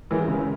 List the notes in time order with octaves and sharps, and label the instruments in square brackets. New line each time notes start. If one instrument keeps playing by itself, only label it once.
[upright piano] E3 [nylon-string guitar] G#3 C#4 E4 G4 A#4
[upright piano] C#3